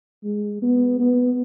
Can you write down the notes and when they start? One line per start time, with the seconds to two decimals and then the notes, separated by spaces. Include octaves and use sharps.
0.24 G#3
0.62 B3
1.00 B3